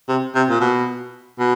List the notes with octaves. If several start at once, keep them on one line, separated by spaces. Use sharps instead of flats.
C3
C3
A#2
B2
B2